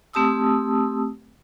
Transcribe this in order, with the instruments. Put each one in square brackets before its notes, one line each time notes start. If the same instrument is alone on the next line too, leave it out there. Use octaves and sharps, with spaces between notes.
[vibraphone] A3 C4 G4 A5 D#6 E6